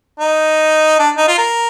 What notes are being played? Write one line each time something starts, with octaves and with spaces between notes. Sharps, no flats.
D#4
D4
D#4
F4
A#4